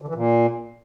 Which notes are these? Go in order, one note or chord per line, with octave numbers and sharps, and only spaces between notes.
D3
E3
A#2